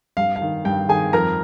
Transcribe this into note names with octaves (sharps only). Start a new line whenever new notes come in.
G2 F5
F5
D#3
G2 G5
D#3 G#4 G#5
F2 A#4 A#5